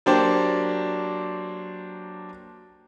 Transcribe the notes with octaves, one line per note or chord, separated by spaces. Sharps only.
F#3 A#3 D4 G4 C5 D5